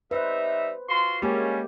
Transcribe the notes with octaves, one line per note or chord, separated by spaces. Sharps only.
G3 D#4 B4 C5 E5
F4 F#4 C6
D3 G3 G#3 A#3 C#4 G4